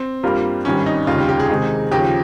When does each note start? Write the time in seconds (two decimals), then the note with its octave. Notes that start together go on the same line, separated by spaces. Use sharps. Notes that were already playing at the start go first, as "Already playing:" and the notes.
Already playing: C4
0.23 G2 G3 A#3 F4 A#4
0.65 G#1 G2 D#3 G3 C#4
0.86 D#4
1.07 F1 D#2 C#3 G3 F4
1.18 G4
1.29 G4
1.40 G#4
1.50 C3 D#3 G#3 D#4
1.92 D#2 C#3 F3 G4